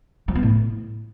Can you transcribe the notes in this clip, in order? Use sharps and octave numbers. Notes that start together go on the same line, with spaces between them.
F3
B3
A2